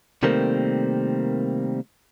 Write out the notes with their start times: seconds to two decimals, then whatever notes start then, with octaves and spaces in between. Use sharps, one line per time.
0.23 C3 D#3 G3 A3 A#3 C4